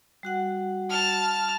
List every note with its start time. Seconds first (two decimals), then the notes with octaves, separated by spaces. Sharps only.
0.23 G3 F#4 F#5
0.90 A5 F6